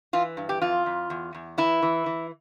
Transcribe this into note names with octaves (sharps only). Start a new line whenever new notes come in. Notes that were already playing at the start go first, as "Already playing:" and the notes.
E3 F4
G2
G4
F2 F4
F2
E2
E2
E3 E4
E3
E3